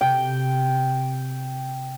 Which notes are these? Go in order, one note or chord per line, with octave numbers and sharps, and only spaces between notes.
C3 G5